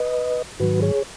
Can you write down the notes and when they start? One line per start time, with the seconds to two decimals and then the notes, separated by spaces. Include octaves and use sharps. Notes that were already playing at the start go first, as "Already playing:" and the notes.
Already playing: B4 D#5
0.60 G#2 D#3 F#3 F#4 B4
0.82 G#4 C#5